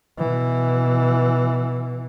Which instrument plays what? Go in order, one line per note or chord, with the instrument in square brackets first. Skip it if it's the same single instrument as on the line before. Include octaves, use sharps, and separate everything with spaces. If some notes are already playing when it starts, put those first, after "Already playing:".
[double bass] B2 E3